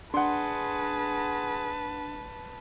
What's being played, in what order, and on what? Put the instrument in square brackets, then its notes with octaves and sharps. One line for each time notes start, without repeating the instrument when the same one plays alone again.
[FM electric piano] D4 [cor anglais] G#4 [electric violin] B4 A5 [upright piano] F#5 C6